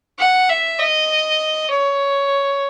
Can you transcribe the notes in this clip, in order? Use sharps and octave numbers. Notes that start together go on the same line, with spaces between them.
F#5
E5
D#5
C#5